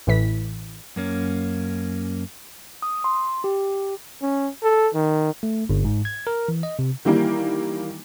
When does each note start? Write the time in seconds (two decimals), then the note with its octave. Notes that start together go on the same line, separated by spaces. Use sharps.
0.07 A1 A2 E3 B6
0.96 F#2 A#3 C#4
2.82 D#6
3.04 C6
3.44 G4
4.22 C#4
4.63 A4
4.94 D#3
5.43 A3
5.69 G1
5.84 G#2
6.05 G#6
6.27 A#4
6.48 E3
6.63 D#5
6.79 C3
7.05 D#3 E3 G3 A#3